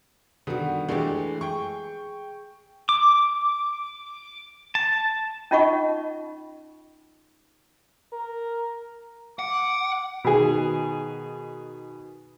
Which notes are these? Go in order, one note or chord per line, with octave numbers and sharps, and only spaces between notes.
D3 D#3 G3 B3 F#4
E3 G#3 A3 D4 G4
G#4 G5 C#6
D6
A5
C#4 D#4 F4 D#5 F#5 C#6
A#4
F#5 D6
B2 D#3 G#4